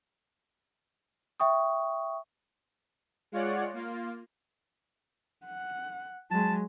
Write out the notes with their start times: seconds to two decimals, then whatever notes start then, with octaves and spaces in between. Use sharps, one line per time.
1.40 E5 G5 C#6 D#6
3.32 G#3 F4 C#5 D5 F#5
3.74 A#3 F4
5.46 F#5
6.31 F#3 G#3 A5